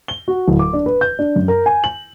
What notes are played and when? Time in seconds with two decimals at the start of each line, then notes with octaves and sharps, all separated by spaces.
0.08 G7
0.28 F#4
0.48 D1
0.59 D6
0.73 D4
0.86 B4
1.01 G6
1.19 D4
1.36 F#2
1.48 A#4
1.66 G#5
1.84 F#7